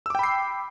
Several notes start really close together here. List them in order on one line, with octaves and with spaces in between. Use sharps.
E6 D6 G5 B5 C7